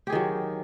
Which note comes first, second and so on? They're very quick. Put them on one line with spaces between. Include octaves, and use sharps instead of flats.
G4 G#4 D#3 F#3